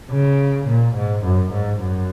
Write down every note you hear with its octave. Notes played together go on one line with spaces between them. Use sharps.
C#3
A#2
G#2
F#2
G#2
F#2